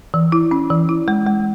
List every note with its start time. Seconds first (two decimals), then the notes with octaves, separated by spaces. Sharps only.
0.14 E3
0.32 E4
0.51 C#4
0.70 E3
0.89 E4
1.08 G#3
1.27 G#3